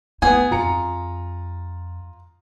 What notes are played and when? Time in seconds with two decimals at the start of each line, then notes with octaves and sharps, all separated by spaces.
0.22 A3 B3 E4 G#4
0.51 F2 F4 A#5 C#7